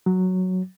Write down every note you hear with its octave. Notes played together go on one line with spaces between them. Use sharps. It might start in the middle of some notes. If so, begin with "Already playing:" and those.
F#3